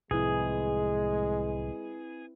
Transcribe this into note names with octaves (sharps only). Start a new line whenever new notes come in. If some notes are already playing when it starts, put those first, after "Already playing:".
C2 A2 F3 G#3 C4 E4 G#4 B4